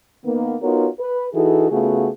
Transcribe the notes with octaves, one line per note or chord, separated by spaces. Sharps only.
D#3 A#3 B3
B3 D#4 F4 F#4 A#4 C#5
B4
E3 D#4 E4 F#4 G#4 A4
C#3 A3 B3 F4 F#4 G#4